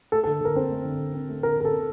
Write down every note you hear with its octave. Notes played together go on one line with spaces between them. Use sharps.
A3 A4
A4
D3
D3 A#4
C4 C5
A3
D3
D3
C4
A3
D3 A#4
D3 A#4
A4
C4